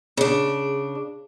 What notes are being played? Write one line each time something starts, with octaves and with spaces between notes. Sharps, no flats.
C#3 D4